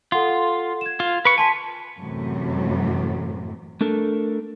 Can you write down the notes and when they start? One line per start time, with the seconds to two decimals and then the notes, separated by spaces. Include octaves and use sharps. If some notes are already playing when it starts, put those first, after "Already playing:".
0.12 F4 A4 F#5 C6
0.81 G#6 E7
1.00 F4
1.25 B4 C#6
1.38 G#5 A5 C6 B6
2.00 F#2 A2 C3 E3 F#3 A3
3.81 A3 D4 A4 A#4